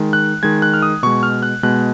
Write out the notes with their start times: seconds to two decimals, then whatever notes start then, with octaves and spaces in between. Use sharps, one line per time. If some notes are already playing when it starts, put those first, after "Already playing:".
Already playing: D#3 G#3
0.13 F#6
0.43 D#3 G#3 G#6
0.62 F#6
0.74 F6
0.82 D#6
1.03 B2 G#3 C#6
1.23 F6
1.43 F#6
1.63 B2 G#3 F#6